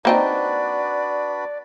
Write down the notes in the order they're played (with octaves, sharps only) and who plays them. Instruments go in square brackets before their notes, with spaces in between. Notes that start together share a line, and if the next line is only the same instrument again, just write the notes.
[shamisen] A#3 C4 D#4 [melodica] D4 F#4 B4 [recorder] D5